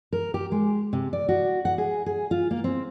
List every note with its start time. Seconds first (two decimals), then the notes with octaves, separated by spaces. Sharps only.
0.13 A#4
0.34 G4
0.52 G#3
0.93 C3
1.13 D5
1.29 F#4
1.65 F#5
1.78 G#4
2.06 G#4
2.31 F4
2.51 A#3
2.64 C4